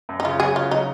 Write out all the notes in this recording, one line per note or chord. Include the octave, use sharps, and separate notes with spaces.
F#2
D#4
C#3 F4
F#3 G#4
C#3 F4
F#3 D#4